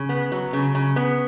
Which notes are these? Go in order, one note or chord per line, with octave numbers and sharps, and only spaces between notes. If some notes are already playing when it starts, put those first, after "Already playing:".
Already playing: C#3
B3
F#3
C#3
C#3
B3